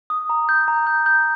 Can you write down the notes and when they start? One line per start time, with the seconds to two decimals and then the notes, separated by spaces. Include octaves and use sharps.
0.10 D#6
0.30 A#5
0.49 G6
0.68 A#5
0.87 G6
1.06 G6